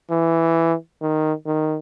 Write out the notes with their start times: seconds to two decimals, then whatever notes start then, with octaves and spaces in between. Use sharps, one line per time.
0.10 E3
1.01 D#3
1.45 D#3